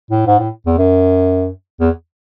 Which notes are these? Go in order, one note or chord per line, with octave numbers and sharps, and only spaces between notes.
A2
G#2
A2
E2
F#2
E2